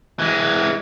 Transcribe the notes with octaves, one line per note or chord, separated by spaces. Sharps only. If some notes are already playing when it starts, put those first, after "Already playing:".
E3 G#3